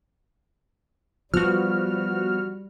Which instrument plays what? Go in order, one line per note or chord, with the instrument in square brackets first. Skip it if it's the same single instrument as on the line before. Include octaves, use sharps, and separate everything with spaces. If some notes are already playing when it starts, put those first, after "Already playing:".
[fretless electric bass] F3 [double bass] G3 [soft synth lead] B3 [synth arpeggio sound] F#4 F6